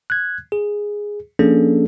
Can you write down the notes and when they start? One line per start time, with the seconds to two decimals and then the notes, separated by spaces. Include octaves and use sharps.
0.10 F#6 G#6
0.52 G#4
1.39 F3 A#3 C#4 D4 G#4 A4